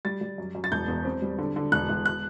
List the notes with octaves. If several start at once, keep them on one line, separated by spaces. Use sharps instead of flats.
G3 A6
G3
F#2
F#2
A6
E1 G6
E2
C4
G3
D3
D3
E1 F#6
E1
F#6